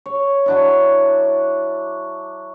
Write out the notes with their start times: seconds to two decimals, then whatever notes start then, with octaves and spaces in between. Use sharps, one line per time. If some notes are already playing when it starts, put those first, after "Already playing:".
0.06 C#5
0.46 F#3 D4 E4